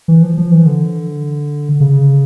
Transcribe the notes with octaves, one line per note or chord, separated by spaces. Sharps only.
E3
F3
F3
E3
D3
C#3